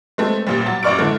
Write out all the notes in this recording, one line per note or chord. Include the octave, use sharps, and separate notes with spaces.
G#3 A3 C4
A1 A#2 G3
F#3 A6
A1 F#2 D5 C#6 F6 D7
D3 E3 G#3 A3